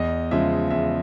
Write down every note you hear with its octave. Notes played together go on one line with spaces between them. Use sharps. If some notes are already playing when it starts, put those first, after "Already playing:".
Already playing: E2 D#5
C#3 F3 G#3 E5
E2 E5